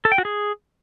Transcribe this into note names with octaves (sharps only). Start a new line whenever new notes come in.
A4
G5
F#4
G#4